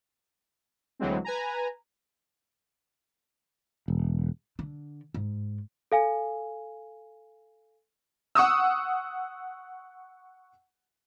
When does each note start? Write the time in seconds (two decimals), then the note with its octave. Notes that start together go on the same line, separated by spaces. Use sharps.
0.99 D2 E3 F#3 G#3 C4
1.24 B4 G#5 A#5
3.88 E1
4.59 D3
5.14 G#2
5.92 A4 F5 G#5
8.35 F#5 C#6 D#6 E6